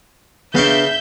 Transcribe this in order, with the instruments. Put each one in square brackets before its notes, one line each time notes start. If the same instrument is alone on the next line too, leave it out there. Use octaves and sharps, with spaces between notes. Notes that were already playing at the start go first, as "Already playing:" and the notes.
[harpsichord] C#3 F5 C#6 [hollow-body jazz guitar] B3 D4 [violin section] E5 G6